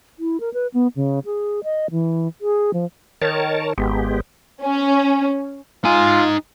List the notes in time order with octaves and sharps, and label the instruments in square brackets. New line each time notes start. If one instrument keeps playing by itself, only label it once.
[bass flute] E4
A#4
B4
B3
C#3
G#4
D#5
E3
G#4
F3
[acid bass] D#3 [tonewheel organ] A#4 C#5 A5
[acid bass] G#1 [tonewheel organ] G#3 B3 G4
[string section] C#4
[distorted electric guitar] D#4 G#5 [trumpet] F4